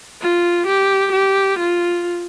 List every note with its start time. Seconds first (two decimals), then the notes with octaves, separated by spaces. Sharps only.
0.21 F4
0.67 G4
1.13 G4
1.59 F4